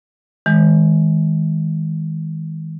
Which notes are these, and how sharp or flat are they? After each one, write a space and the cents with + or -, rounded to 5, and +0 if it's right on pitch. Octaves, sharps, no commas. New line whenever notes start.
D#3 +45 G#3 +0